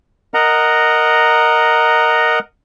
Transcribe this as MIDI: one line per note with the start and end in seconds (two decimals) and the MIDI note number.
0.34 2.39 70
0.34 2.39 75
0.34 2.39 78
0.34 2.39 82